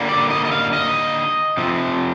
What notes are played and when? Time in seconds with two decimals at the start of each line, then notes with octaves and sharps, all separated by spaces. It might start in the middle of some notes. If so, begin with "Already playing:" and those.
Already playing: D3 G3 A#3
0.09 D5
0.30 D#5
0.45 D#5
0.51 F5
0.73 D#5
1.57 C3 F3 C4